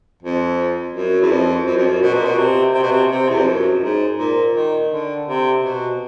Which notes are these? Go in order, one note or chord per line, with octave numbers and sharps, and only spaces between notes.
F2
F#2
E2
F2
F#2
F2
F#2
B2
A#2
B2
C3
C3
B2
C3
C3
E2
F2
F#2
G#2
A#2
D#3
D3
C3
B2